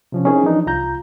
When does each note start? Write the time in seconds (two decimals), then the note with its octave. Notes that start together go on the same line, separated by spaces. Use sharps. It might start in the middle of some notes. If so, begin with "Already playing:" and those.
0.12 C3 F3 C#4
0.25 C4 C#4 D#4 E4 G#4 A#4
0.43 E3 F3 D4 D#4
0.66 C2 F4 A#5 G6